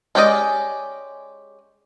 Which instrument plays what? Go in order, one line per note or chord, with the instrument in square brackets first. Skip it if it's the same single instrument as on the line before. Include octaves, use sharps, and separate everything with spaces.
[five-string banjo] G#3 C#4 G4 D5 D#5